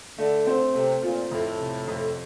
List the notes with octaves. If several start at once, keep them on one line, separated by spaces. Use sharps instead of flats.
D3 A3
C4
C3 A3
A#2 F4
F2 A2
C3
F2